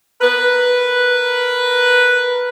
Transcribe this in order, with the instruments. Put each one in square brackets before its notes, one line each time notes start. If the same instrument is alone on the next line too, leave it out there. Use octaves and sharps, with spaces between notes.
[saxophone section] A#4 B4